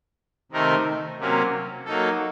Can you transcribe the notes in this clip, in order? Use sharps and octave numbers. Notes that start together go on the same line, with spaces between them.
C3 D#3 A3 D#4 A#4
C3 F#3 A#3 C#4
F#3 A#3 D#4 A4